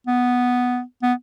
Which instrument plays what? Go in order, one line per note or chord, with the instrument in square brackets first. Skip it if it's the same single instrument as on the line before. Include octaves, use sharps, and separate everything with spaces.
[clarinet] B3
B3